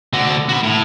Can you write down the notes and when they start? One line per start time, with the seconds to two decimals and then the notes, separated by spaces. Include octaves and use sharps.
0.13 D3 F#4
0.49 F#4 B5
0.63 A2